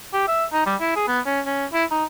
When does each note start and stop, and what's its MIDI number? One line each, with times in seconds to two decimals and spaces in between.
0.13 0.24 67
0.28 0.45 76
0.53 0.65 63
0.66 0.75 55
0.80 0.95 64
0.96 1.06 68
1.08 1.20 59
1.26 1.41 61
1.46 1.65 61
1.73 1.84 64
1.91 2.04 63